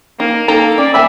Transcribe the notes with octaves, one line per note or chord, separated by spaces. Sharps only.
A#3 D#4
A#3 D#4 A4 A#5
C#4 D5
A#3 E5 G#5 B5